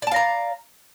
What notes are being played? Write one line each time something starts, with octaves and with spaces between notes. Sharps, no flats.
D5 F5 A5 A#5